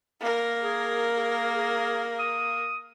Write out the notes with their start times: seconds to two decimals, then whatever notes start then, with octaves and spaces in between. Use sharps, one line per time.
0.21 A#3 A#4
0.62 G#4
1.17 G#4
1.56 G#4
2.19 D#6